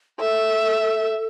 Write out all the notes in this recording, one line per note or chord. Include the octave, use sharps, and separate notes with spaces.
A4 E5